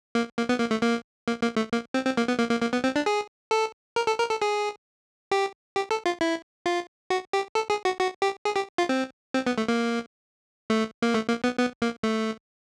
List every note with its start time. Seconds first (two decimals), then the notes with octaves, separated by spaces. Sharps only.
0.15 A#3
0.38 A#3
0.49 B3
0.60 A#3
0.71 A3
0.82 A#3
1.28 A#3
1.42 A#3
1.56 A3
1.73 A#3
1.94 C4
2.05 C4
2.17 A#3
2.28 B3
2.39 A#3
2.51 A#3
2.61 A#3
2.73 B3
2.84 C4
2.96 D4
3.06 G#4
3.51 A4
3.96 A#4
4.07 A4
4.19 A#4
4.30 A4
4.42 G#4
5.31 G4
5.76 G4
5.91 A4
6.06 F4
6.21 E4
6.66 F4
7.10 F#4
7.33 G4
7.55 A4
7.70 G#4
7.85 F#4
8.00 F#4
8.22 G4
8.45 G#4
8.56 G4
8.78 F4
8.89 C4
9.34 C4
9.47 B3
9.58 A3
9.68 A#3
10.70 A3
11.02 A#3
11.14 A3
11.29 A#3
11.44 B3
11.59 B3
11.82 A#3
12.03 A3